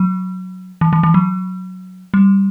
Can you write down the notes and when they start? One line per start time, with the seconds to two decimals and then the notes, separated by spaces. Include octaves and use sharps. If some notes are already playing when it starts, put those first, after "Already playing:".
Already playing: F#3
0.81 E3
0.93 E3
1.03 E3
1.14 F#3
2.14 G3